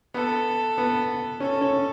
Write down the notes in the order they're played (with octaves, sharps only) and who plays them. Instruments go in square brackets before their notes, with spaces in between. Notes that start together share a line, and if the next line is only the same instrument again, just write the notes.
[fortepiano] B3 [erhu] A4
[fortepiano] B3
[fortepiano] C#4 [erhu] A4
[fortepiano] C#4